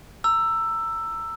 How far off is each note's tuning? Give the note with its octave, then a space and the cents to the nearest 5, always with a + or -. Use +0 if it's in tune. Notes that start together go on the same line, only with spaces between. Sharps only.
A#5 -20 E6 +10